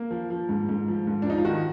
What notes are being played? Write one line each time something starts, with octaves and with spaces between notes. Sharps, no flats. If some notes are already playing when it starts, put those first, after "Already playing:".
Already playing: A#3
F3
F3
G#2
G#2
F3
G#2
D4
F3 D#4
F4
D#3 F#4